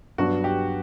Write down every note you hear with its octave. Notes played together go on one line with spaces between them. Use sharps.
G2 F#3 B3 D4 F#4
G4